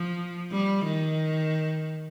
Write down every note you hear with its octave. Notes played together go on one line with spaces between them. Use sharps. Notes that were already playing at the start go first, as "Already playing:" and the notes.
Already playing: F3
G3
D#3